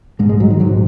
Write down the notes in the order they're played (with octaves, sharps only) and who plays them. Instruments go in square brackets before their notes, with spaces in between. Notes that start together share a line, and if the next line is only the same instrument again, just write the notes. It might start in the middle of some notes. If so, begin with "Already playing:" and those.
[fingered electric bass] A#1 G#2 G#3
G#3
F#3
D#3
A#1 G#2 F#3